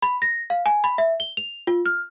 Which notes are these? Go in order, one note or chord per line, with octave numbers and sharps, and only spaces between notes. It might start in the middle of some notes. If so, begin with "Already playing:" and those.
B5
A#6
F5
G#5
B5
E5
G7
F7
F4
F6